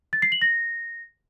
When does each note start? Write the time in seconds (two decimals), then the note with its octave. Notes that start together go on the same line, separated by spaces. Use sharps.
0.13 A6
0.22 C7
0.32 F#7
0.42 A#6